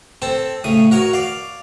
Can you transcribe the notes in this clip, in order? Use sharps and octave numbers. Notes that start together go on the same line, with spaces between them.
C4 A4 A5
A2 C#3 D#6
F#4 A#4 C#5
D5 F5